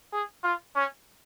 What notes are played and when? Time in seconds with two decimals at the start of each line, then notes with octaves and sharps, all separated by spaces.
0.13 G#4
0.44 F4
0.76 C#4